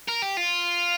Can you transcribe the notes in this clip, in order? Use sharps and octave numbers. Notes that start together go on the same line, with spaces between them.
A#4
G4
F4